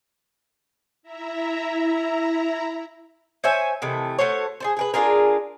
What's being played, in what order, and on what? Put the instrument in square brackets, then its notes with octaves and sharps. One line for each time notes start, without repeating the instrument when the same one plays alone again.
[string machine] E4 E5 A#5
[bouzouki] C5 C#5 E5 G#5
C3 D#3 E3 A3
A3 F#4 C5 C#5
G#4 A4 C5
G#4 A#4 B4
D4 F4 G#4 A#4